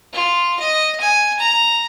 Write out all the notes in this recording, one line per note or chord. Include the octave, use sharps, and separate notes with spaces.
F4
D#5
G#5
A#5